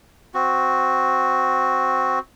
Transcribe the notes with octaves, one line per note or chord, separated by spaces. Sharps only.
C4 F#4